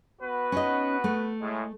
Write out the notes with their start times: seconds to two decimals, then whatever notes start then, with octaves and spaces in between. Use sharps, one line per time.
0.22 B3 F#4 B4
0.52 C#4 D#4 D#5
1.04 A3
1.41 A2 G#3